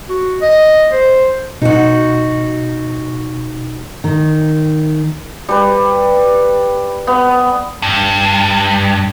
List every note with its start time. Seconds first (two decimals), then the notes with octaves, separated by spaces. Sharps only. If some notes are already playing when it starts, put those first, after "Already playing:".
0.09 F#4
0.42 D#5
0.92 C5
1.62 B2 D#4 F#4
4.04 D#3
5.49 G3 B4
7.07 B3
7.82 G2